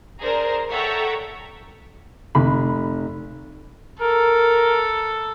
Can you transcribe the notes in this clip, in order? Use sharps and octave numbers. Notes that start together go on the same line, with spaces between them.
D4 G#4 A#4 C5 A#5
A4 C#5 E5 F#5 G5 A#5
F1 B5
A4 A#4